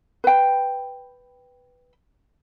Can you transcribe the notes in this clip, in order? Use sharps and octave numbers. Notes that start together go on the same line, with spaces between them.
B4 G5